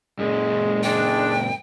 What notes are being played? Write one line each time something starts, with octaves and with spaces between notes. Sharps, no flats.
F#2 A#2 G#3
G#3 D4 G5